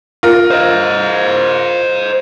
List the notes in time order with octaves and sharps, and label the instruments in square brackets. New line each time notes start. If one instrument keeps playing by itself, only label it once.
[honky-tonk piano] F4 A#4
[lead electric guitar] C5 D#5